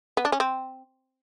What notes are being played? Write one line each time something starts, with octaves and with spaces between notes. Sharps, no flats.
B3
D4
C#4
C4